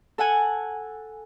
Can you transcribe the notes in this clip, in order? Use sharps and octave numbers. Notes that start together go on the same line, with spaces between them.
A4 F#5 G#5